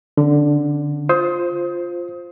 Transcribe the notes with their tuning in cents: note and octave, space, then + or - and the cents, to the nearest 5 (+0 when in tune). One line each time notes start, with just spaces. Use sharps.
D3 +0 C#4 -30
F4 +0 C5 +5 D#6 +30